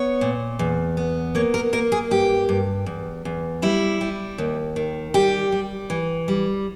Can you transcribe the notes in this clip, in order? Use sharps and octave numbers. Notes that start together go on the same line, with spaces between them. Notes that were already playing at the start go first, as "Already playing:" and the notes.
Already playing: B3 C#5
A#2
E2
B3
A#3 C#5
A#4
A#3 A#4
G#4
G2 G4
G2
E2
E2
G3 E4
G3
D#2
D#3
G3 G4
G3
E3
G3